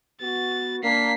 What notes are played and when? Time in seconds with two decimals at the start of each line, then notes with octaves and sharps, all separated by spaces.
0.21 B3 F#4 A6
0.83 A#3 D4 B6 C7